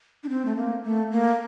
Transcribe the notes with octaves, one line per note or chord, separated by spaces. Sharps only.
D4
C4
A3
A#3
A3
A#3